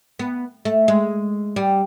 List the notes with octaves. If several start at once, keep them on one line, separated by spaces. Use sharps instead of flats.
B3
A3
G#3
G3